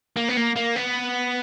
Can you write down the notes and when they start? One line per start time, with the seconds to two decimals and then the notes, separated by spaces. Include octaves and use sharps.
0.17 A#3
0.28 B3
0.37 A#3
0.56 A#3
0.75 B3